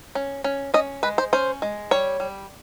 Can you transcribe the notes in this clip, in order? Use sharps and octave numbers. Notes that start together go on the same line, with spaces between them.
C#4
C#4
C#4 D#5
G#3 B4
C5
C#4 C5
G#3
G3 C#5
G3